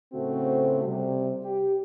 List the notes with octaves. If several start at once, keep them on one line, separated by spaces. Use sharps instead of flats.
A2 C#3 A3 C4 F#4 C5
C3 G3
G4